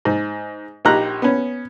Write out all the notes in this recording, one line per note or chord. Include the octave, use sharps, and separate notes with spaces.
G#2
A#1 D#4 G4 A#5 F#6
B3 C#4